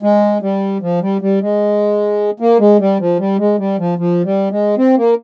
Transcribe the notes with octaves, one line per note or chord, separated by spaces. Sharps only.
G#3
G3
F3
G3
G3
G#3
A#3
G#3
G3
F3
G3
G#3
G3
F3
F3
G3
G#3
C4
A#3